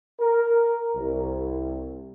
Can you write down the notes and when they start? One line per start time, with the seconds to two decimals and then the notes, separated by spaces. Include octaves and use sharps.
0.20 A#4
0.96 C2